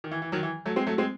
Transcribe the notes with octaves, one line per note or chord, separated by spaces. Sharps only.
D#3
E3
E3
D#3 F#3
E3
F#3 A3
G#3 C4
F#3 A3
G#3 C4